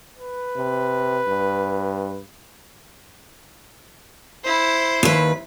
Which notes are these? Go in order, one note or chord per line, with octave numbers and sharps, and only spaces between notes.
B4
C3
G2
E4 C5
D#2 B4